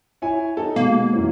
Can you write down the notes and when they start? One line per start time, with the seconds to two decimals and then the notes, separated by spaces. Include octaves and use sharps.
0.22 E4 C#5 G#5
0.57 D#4 A4
0.76 B2 G#3 A#3
1.14 F#2 E3 C#4